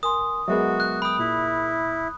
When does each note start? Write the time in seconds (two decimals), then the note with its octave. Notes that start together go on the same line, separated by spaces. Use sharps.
0.03 A#4 G#5 C6 D#6
0.48 F#3 G#3 B3 F#4 G#4 A#4 E5
0.80 F#6
1.02 G5 B5 D#6
1.19 A#2 E4